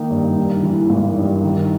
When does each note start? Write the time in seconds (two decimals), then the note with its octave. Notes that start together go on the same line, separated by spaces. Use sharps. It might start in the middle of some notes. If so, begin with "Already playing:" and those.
Already playing: D#3 A#3 D#4
0.10 G2
0.37 G2
0.63 E3
0.90 G#1
1.17 G2
1.43 D#3